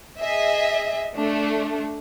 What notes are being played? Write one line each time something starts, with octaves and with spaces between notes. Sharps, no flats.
G#4 D#5 E5
A3 D4